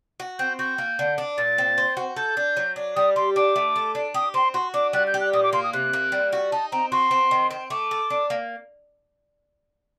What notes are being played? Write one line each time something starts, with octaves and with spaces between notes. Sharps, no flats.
F#4
C4 G6
F#4 G6
A#3
D3
D4
A#2 A6
C4
C5
F#4
A4 G6
D4
F#3
D4
G3 D#6
G4 C6
D4 D6
A3
A4
D4
G4 D#6
C4 C6
F#4 C6
D4 D6
G3 F#6
G6
G4
F#6
A#2 D#6
D6
A#3 C6
D#6
C3 F#6
A#3
G3
F#4
D#4 A5
C4 A#5
F#4 C6
C4
D#3
C4
A3 D6
A4
D4
A#3